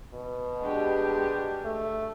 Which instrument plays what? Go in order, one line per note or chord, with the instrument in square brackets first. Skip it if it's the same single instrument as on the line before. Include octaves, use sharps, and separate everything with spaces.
[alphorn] B2
[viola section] G#3 D4 G4
[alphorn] A3